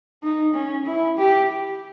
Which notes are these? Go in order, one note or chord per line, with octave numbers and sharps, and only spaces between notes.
D#4
C#4
E4
G4